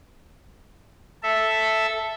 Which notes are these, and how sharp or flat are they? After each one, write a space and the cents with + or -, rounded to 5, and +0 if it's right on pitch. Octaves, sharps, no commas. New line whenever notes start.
A4 +0 E5 +0